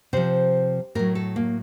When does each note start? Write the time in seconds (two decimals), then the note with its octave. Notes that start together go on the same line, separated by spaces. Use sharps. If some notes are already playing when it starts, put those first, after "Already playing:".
0.13 C3 F3 C5
0.95 A2 F#3 A#4
1.15 A4
1.36 A#3